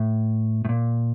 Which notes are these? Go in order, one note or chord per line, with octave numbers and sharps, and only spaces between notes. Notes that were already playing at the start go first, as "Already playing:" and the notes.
Already playing: A2
A2
A#2